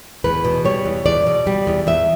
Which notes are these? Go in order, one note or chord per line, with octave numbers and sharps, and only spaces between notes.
E2 B4
B2
G3 C#5
E2
E2 D5
B2
G3
E2
E2 E5